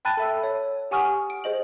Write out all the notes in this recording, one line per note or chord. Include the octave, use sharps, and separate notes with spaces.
G5 A5 B5 F#6 A6 D#7
A4 E5 E6
C#5
G4 F#5 G#5 C#6 D#6 F6
D7
G#4 C5 D#5 F#7